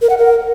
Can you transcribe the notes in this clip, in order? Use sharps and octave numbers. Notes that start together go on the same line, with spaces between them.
A#4
F#5
A#4